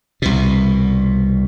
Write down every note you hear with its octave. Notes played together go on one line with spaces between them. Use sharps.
C2 B2